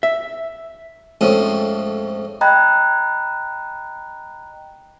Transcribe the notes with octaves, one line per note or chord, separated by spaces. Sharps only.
E5
F2 G#2 F3 A3 C4 C#4
D#5 G5 A#5 B5 F#6 G#6